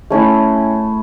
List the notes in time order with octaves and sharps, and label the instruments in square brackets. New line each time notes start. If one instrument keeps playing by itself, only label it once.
[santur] A3 C#4 E4